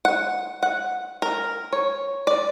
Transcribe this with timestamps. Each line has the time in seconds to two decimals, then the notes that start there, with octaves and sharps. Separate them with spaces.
0.05 F#5
0.63 F#5
1.22 A#4
1.73 C#5
2.27 D5